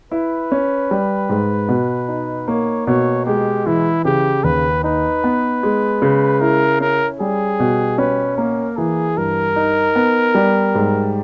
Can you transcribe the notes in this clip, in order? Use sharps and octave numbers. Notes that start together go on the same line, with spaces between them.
E4 B4
C#4
G3
G#2
B2
D#4
A#3 C#5
B2 C#5
G#3 G4
E3 E4
C#3 G4
D#2 B4
D#4 B4
B3
G#3
C#3
E4 A#4
C#4 A#4
G3 G#4
B2
C#4 B4
A#3 A#4
E3 G#4
G2 A#4
D#4
B3
G3
G#2